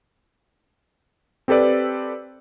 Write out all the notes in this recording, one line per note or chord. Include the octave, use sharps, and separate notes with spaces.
C4 G4 A4 B4 D5